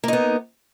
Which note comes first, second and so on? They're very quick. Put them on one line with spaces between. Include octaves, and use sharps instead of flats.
A#3 D#4 B3